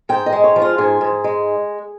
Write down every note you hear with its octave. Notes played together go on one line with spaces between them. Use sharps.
G#2 G5
D#5
G#3
C#5
F3
F4
G#2 G#4
G#2
G#3